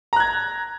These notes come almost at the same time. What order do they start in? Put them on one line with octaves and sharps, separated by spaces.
A#5 F#6 G#6